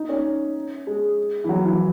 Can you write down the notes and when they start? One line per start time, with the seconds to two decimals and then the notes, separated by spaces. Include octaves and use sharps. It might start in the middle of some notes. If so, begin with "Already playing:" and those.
Already playing: D#4
0.09 C#4
0.87 G#3
1.44 E3
1.49 F#3
1.65 E3